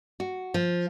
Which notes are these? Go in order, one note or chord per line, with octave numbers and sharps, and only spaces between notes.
F#4
F3